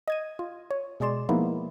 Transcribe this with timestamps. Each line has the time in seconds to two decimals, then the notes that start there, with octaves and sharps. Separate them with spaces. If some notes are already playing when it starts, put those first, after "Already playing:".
0.08 D#5 G#6 D#7
0.39 F4
0.71 C#5
1.00 B2 G#3 G#4 D5 C6 E7
1.29 F3 G#3 A#3 B3 D#4 E4